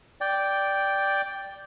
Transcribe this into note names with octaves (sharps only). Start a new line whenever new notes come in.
D5 G5